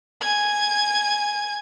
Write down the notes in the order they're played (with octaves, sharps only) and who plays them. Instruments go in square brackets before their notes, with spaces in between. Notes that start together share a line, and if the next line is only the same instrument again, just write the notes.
[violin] G#5 G#6